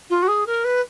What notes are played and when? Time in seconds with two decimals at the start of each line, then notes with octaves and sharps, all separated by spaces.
0.09 F4
0.22 F#4
0.27 G#4
0.46 A#4
0.64 B4